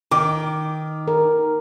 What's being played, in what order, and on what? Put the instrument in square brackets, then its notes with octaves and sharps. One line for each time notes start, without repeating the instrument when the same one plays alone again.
[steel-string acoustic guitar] D#3 [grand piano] D6
[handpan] A#4